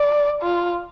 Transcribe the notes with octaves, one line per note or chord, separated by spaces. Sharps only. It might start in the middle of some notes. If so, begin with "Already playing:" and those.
Already playing: D5
F4